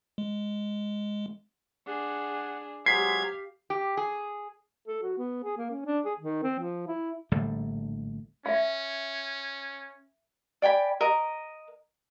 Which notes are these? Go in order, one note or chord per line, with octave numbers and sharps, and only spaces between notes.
G#3
D4 G#4 F#5
F#3 G#3 C4 G4 F5 G#6 B6 C7
G4
G#4
A4
F#4
B3
G#4
A#3
C#4
D4
G#4
D#3
C4
F3
E4
A#1 A2 D3 G3
C#4 E5 F5
D5 G5 G#5 B5
A#4 D#5